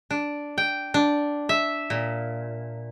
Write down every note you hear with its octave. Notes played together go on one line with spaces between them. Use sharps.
D4
G5
D4
E5
A#2